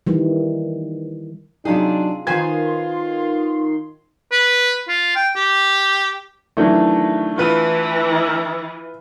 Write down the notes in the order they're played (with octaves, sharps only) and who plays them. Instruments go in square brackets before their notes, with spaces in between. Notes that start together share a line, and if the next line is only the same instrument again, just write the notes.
[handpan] D#3 E3 G3
[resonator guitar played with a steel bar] C3 F4 G#4 [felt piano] F#3 D#4 [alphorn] D4
[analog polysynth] D#3 C6 [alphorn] F4 [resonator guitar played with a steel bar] B4 C5 G#5 [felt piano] G#6
[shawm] B4
F4
G5
G4
[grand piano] D#3 E3 F#3 [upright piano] A3 D4
[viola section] E3 [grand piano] F4 B4